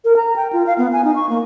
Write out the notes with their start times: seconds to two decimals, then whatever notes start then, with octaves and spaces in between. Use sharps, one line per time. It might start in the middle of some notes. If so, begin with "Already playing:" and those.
0.05 A#4
0.17 A#5
0.36 G5
0.53 F4
0.67 F5
0.78 B3
0.93 G#5
1.04 D#4
1.16 C#6
1.29 A#3